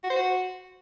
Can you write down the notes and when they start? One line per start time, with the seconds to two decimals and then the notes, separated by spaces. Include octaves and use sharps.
0.04 F#4
0.10 C5
0.16 F#4